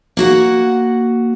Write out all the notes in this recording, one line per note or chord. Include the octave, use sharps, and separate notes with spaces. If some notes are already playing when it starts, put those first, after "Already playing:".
A#3 F#4 F#5